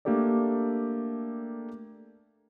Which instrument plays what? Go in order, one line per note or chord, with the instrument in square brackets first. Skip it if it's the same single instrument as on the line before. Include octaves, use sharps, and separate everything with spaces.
[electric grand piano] A3 A#3 D4 G4 A4 D5